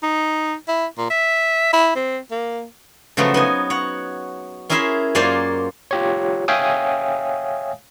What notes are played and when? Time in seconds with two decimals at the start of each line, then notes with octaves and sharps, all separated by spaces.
0.03 D#4
0.68 E4
0.98 A#2
1.10 E5
1.73 E4
1.96 C4
2.31 A#3
3.17 C#3 F3 F#3 A3 B3
3.34 B3 D#4 G#5
3.70 C#5 F#5
4.69 C#4 E4 G#4 A#4 E5 C6
5.15 F#2 A#3 F4 C5 D5 G#5
5.91 F4 G4 C#5
6.48 C#5 E5 F5 G5 G#5 D#6